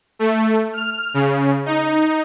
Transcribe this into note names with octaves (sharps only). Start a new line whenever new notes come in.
A3
F6
C#3
D#4